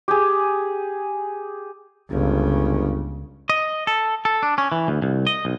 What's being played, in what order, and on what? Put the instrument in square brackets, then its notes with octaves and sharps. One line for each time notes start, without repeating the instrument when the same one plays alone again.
[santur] G4 G#4
[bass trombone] G1 [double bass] C#2 C#3
[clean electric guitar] D#5
A4
A4
D4
C#4
E3
D2
C2
D#5
B1